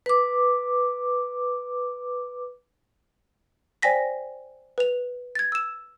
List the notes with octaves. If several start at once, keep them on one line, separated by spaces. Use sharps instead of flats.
B4 D6
C5 D5 G5 G#5 A#6 B6
B4 F7
G#6 A6
E6 E7